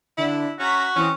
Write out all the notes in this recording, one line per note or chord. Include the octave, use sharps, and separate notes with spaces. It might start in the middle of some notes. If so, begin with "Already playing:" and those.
D3 D4 E4
C#4 F#4 A#5 G#6 B6
E3 C4 C#4 D#6